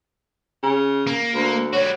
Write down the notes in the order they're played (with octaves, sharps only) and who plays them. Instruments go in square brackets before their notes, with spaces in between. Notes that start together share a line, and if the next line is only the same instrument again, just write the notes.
[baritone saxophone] C#3
[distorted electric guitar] A#3
[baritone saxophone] D2
[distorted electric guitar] G3 F#4 [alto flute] C#5